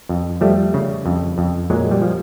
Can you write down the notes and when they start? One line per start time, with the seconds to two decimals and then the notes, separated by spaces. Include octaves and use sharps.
0.09 F2
0.41 F3 G3 A3
0.74 C#3
1.06 F2
1.38 F2
1.70 A#2 F#3 G#3
1.91 G3
2.02 F3